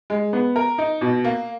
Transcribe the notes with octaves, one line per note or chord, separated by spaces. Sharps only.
G#3
B3
A#4
D#4
B2
A#3